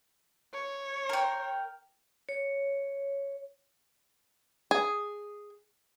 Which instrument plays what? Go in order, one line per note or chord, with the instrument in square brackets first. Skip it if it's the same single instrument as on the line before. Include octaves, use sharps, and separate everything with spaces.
[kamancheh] C#5
[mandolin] A#4 G5
[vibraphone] C#5
[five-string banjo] G#4